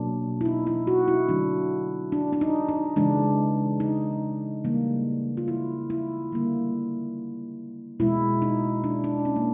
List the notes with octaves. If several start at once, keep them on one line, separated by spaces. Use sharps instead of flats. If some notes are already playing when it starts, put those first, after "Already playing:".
Already playing: B2 F#3 A#3 D4
E4
D#4
E4
F#4
E4
D3 F#3 A3 D4
D4
D4
D#4
D#4
C#3 E3 G#3 D4
D#4
C#3 E3 G3 A#3
F4
E4
E4
D3 G3 A#3
B2 G#3 E4
D#4
D4
D4
C#4
A#3